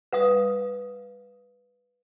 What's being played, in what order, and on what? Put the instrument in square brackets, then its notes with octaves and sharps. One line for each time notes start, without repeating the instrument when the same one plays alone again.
[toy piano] B4 F5 D#6